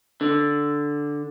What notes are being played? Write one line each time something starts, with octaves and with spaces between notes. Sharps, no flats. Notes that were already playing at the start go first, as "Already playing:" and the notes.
D3